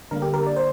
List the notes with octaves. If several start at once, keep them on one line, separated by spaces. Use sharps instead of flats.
D3 G3 A#3 A#4
G4
A#4
D5
C5